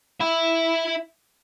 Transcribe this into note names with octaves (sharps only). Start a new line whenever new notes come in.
E4 E5